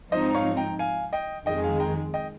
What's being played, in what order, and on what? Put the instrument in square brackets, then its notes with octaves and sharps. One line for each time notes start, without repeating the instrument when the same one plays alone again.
[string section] G#2 F3 C4 D#4 [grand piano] C5 D#5
[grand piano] C#5 F5
G5 A#5
F5 G#5
D#5 G5
[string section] F2 D#3 G#3 [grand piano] D#5 G5
[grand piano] F5 G#5
G5 A#5
D#5 G5